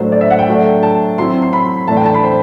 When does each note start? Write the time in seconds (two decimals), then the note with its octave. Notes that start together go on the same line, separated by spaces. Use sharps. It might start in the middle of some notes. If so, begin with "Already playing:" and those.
Already playing: A2 F#3 A3 D4 C5
0.12 D5
0.21 E5
0.30 F#5
0.39 G5
0.48 F#3 A3 D4
0.83 A5
1.18 F#3 C4 E4 C6
1.42 C6
1.53 B5
1.88 A2 E3 A3 D4 A5
1.97 G5
2.06 A5
2.14 B5
2.23 C5